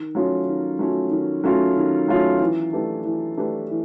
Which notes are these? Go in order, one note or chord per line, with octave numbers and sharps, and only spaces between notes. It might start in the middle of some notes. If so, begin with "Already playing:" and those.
Already playing: D#3
F#3 A3 C#4 F4
D#3
F#3 A3 C#4 F4
D#3
F#3 A3 C#4 F4
D#3
F#3 A3 C#4 F4
E3
A3 D4 G4 B4
E3
A3 D4 G4 B4
E3